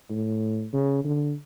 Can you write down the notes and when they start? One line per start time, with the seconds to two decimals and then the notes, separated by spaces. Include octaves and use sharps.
0.10 A2
0.73 C#3
1.04 D3